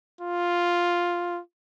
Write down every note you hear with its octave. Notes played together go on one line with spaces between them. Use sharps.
F4